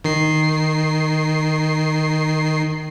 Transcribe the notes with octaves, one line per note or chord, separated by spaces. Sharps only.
D#3 C7